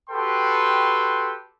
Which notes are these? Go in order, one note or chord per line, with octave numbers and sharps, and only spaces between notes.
F#4 G4 A4 B4 G5 C6